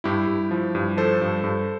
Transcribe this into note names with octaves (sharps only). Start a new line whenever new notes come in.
G2 E4 G4
G2
F3
G2
F3 A4 C5
G2
G2